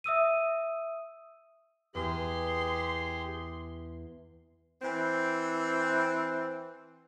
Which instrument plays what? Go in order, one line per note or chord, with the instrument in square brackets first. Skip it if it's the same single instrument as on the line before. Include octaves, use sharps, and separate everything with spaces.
[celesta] E5 D#6 E6 D#7
[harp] E2 D#6 [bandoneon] G4 G#4 [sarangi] C6
[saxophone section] E3 C4